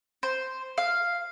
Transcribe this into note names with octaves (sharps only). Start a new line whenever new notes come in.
C5
F5